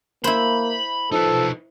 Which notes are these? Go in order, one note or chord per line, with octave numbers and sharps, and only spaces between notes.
A#3 E4 C5 B5
F3 D#4 A4 B4